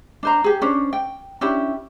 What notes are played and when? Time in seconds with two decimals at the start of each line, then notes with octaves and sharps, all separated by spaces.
0.23 D4 C5 A#5
0.44 G4 G#4
0.62 C#4 D4 C5
0.93 G5
1.41 C#4 D4 E4 G4